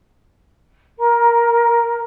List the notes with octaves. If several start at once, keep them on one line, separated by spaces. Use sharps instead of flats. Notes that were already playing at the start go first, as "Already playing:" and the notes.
A#4 A#5